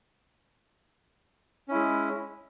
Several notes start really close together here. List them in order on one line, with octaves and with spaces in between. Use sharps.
C#4 E4 G#3